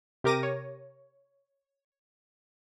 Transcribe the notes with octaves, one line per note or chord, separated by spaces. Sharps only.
C3 G4 A#4 D6 A#6 D#7
C#5